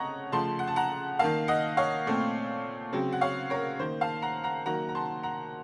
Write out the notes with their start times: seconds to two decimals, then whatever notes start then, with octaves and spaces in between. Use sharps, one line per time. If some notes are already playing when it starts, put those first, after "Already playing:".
Already playing: C#3 A3 C4 C#5 D#5 F#5 A#5
0.32 C#3 F3 A3 A5 C6
0.59 F#5
0.67 A5
0.76 F#5 A#5
1.19 D#3 A#3 F5 A5
1.48 D#5 F#5
1.77 C#5 F5
2.06 A#2 A3 C4
2.93 C#3 F#3 C4
3.12 F#5
3.21 C#5 F5
3.50 A#4 C#5
3.79 D#3 A#3 C5
4.01 F5 A5
4.22 F#5 A#5
4.44 F#5 A#5
4.66 D#3 F#3 A#3 F#5 A#5
4.89 A#5
4.95 A5 C6
5.23 F#5 A#5